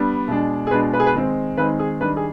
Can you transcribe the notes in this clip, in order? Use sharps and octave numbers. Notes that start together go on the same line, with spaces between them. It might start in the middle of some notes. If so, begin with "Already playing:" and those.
Already playing: G3 B3 D4
B2 G#3 D4
G#4
B2 G#3 D4 B4
B4
G#4
B4
D#3 G#3 C4 D#4
D#3 G#3 C4 D#4 B4
G#4
D#3 G3 D4 B4
G#4